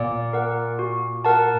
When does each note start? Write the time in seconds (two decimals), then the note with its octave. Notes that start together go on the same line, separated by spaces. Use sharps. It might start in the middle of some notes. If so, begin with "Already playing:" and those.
Already playing: A#2
0.33 A#4 F#5
0.79 F#4
1.25 A#4 F#5 A5